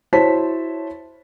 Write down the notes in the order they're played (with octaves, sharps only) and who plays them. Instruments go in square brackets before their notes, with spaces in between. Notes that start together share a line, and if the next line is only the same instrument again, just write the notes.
[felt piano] E4 F#4 C5 C#5 A5 B6